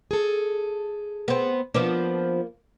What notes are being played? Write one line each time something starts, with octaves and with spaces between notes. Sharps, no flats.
G#4 A4
B3 C4
F3 A#3 B3 D4